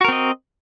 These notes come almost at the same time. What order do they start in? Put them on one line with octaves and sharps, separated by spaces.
F#4 A#4 C4 D#5